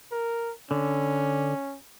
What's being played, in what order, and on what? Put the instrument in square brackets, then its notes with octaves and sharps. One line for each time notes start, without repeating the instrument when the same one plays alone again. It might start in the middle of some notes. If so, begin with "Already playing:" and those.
[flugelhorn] A#4
[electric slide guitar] D3 [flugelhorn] C#4